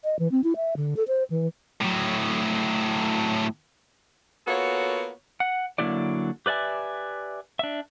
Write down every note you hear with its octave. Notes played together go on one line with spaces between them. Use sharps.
D#5
E3
C4
E4
E5
D3
A4
C5
E3
A2 F#3
A#3 B3 F4 F#4 A4 C#5
F#5
D3 F#3 A#3 E4 G4 D5
G4 B4 D5 E5 G#5
D4 E5